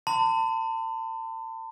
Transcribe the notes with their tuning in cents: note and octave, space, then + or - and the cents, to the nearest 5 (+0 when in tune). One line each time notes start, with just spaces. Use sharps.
A5 +35 C6 -45